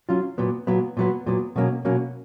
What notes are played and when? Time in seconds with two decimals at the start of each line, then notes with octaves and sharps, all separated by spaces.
0.09 F#3 C#4 F4
0.38 A#2 F#3 B3
0.67 A#2 F#3 B3
0.97 A#2 F#3 B3
1.26 A#2 F#3 B3
1.56 B2 F#3 A#3 C#4
1.85 B2 F#3 A#3 C#4